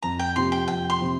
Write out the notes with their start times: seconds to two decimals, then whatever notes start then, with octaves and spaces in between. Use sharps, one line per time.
0.02 F2 A#5
0.19 G5
0.36 C3 F3 C4 G4 C6
0.52 G5
0.68 F2 G5
0.90 C6
1.00 C3 F3 C4 G4